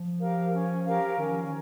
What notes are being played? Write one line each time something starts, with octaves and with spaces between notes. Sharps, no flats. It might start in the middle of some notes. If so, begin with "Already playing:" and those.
Already playing: F3
G4 A#4 F5
C#4
G4 A#4 F5
D#3 C#4
F3
D#3